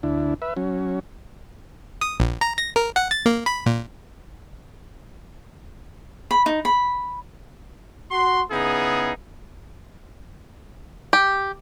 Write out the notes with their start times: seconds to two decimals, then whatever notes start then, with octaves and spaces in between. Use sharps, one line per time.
0.03 D2 D4 E4
0.42 B4 E5
0.57 F#3 C#4
2.01 D#6
2.20 A#1
2.41 A#5
2.58 A#6
2.76 A#4
2.96 F#5
3.11 A6
3.26 A#3
3.46 B5
3.66 A#2
6.31 B5
6.46 D#4
6.65 B5
8.11 F#4 C6
8.51 C#3 B3 D#4 E4 G#4
11.13 G4